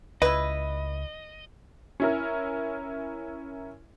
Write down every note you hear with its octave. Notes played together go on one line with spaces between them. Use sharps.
C#2 E4 B4 D#5
C#4 E4 A#4